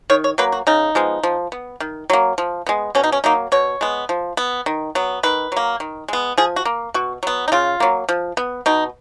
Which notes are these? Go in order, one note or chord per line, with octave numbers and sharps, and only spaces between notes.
D#3 C#5
C#5
F#3 A#3 B4
F#4
C#3 D#4
F3 G#3 B3
F3
B3
D#3
F#3 A#3
F3
G#3 B3
B2 C#4
D#4
C#4
F#3 A#3 D#4
B2 C#5
G#3 B3
F3
B3
D#3
F#3 B3
D#3 B4
F#3 A#3
D#3
G#3 B3
F3 G#4
F#4
A#3
B2 F#4
F#3 B3
D#4
C#3 F4
F#3 A#3
F3
B3
B2 D#4